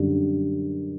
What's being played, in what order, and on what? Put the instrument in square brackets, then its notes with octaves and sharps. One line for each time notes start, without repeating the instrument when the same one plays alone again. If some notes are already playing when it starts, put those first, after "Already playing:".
Already playing: [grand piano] F#2 D3 G3